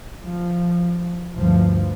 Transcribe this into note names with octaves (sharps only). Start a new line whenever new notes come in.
F3
D2 G2 F3